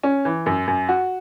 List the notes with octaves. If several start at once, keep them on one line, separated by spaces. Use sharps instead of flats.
C#4
E3
F#2
F#2
F#4